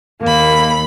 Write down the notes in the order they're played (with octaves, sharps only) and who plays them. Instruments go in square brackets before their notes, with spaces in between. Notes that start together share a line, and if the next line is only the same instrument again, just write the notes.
[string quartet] D#2 B5 [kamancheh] A#3